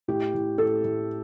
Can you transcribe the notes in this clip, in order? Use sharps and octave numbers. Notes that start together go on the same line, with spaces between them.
A2 G4
A2
A2 A4
A2